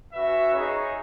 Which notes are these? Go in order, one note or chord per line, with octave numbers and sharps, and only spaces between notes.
C#4 F#4 B4 E5
D#4 G#4 C#5